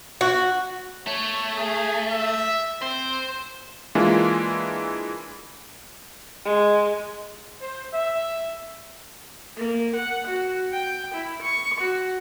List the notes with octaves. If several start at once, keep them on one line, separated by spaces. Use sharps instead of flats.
F#4
A3 C#5
G#4
E5
C4 C5
E3 G#3 A#3 D4 E4 F4
G#3
C5
E5
A#3
F#5
F#4
G5
E4
C#6
F#4